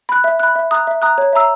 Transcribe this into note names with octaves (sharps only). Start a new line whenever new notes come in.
B5 F#6
E5
B5 F#6
E5
A#5 D#6 F#6
E5
A#5 D#6 F#6
C#5
E5 A#5 E6